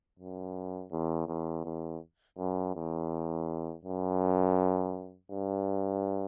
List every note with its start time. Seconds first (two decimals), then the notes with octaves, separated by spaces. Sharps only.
0.19 F#2
0.91 E2
1.28 E2
1.65 E2
2.38 F#2
2.75 E2
3.85 F#2
5.31 G2